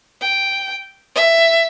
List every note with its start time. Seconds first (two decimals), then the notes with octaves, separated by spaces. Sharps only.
0.21 G5
1.15 E5